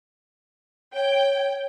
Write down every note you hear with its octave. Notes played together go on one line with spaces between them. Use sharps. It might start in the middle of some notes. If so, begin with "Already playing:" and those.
C#5 G5